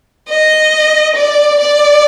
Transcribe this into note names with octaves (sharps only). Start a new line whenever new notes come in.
D#5
D5
D5